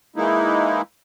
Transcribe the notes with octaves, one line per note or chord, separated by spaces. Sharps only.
E3 G#3 A#3 D#4 E4